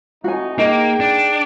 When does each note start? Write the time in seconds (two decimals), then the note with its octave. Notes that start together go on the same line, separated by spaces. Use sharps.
0.24 A2 C3 D#4 F#4 G#5
0.58 A#3 D#4 G#4 G5
1.00 D4